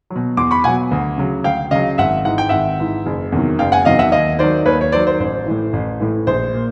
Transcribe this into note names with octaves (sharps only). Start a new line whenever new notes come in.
F#3
B2
E2 C6 D6
B5 C#6
B2 F#3 F#5 G#5
D2
C#3 F#3
D2 F5 G5
C#3 F#3 D#5 F5
G#1 E5 F#5
G#2 E3 F#5
G5
G#1 E5 F#5
G#2 E3
F#1
E2 C3 D#3 F#3
F#1 F5 G5
F#5 G#5
E2 C3 D#3 F#3 D#5 F5
E5 F#5
D#2 D#5 F5
D#3 F#3 C5 D5
D#2 B4 C#5
C#5
D#3 F#3 C5 D5
C5
A1 C5
A2 E3
A1
A2 E3
A#1 C5
A#2